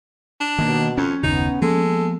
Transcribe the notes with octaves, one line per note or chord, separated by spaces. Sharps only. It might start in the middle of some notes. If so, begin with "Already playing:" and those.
D4
B2 D#3 A#3
F2 C#4
F#1 D#2 C#3 B3 D#4
F3 G#3 A#3 B3 A4